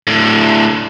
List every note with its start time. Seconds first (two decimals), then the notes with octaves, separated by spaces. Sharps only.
0.07 A2 D3